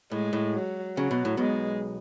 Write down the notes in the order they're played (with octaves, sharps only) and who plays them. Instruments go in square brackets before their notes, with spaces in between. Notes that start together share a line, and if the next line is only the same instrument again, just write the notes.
[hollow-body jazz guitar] A2 [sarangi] G#3
[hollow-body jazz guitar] A2
[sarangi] F#3
[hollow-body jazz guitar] C#3 [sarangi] F#3
[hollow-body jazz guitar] B2
A2
[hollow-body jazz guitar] B1 B2 [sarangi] G#3